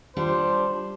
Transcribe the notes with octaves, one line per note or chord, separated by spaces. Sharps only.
G3 D4 F4 C5